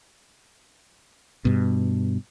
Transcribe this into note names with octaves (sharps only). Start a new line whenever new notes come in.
G2 B2